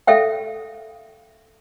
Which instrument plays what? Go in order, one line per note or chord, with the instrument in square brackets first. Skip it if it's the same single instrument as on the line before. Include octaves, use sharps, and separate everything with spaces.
[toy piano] A4 E5 F5 G5